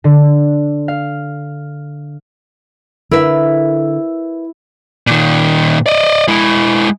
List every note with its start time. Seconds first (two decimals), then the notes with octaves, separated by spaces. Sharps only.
0.04 D3
0.88 F5
3.11 D3 E4 A#4 B4 E5
5.07 A#2 D#3
5.86 D5 D#5
6.28 G#3 E4